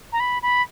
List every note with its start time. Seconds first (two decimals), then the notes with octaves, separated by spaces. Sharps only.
0.13 A#5
0.20 B5
0.42 B5